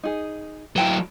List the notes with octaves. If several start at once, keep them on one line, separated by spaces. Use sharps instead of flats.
D#4 G#4
F#3 E4 B4 G5 A5